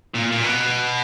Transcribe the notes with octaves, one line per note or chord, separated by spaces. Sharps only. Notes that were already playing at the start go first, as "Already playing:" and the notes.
A#2
A#2
B2